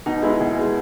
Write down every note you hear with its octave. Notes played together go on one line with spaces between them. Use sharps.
B2 D#4
G#3 B3 E4
B2 G#4
G#3 B3